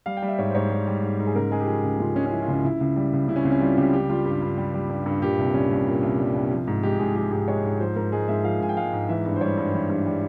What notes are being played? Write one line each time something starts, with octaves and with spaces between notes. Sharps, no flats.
G3 F5
G5
G3
E5
G#2 C#5
C5
G#2 C#5
G3 C5
G3
G#2
G#2
G#4
C#3 A#4
G#3 G#4
G4
F3 G#4
C#2
C#3 F4
G#3 C#4
C#4
F3 E4
F4
C#2
C#4
C#3 E4
C#2
G3
C#2
C#3 E4
C#4
C#2 C4
C#4
G3 F4
C#2 G4
G3 G4
G3 F4
G2 G4
G2
G3
G3
G2
G2
A#2 G4
C2
G3 C#4
C2
A#2
C2
G3
C2
F3
G#2
G#3 G4
G#2 G#4
F3 G4
G#2 G4
G#3 C#5
G#2
F3 C5
G#2 A#4
G#3 G#4
G#2 E5
F3 F5
G#2 G#5
G5
G#3 F5
G#2
E3 E5
G2
C5
G3 C#5
G2
E3
G2
G3